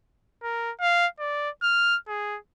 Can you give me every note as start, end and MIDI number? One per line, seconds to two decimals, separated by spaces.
0.43 0.71 70
0.81 1.07 77
1.20 1.49 74
1.63 1.97 89
2.08 2.38 68